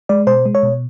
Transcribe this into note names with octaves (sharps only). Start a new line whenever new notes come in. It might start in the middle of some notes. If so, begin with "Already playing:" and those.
G#3 D5
B2 C5
G#3
C#5
B2